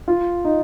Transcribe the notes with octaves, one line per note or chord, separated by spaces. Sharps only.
F4
D#4